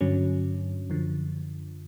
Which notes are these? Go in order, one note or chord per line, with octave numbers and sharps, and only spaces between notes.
G2 D3 F#3 C#4
F#2 D3 F3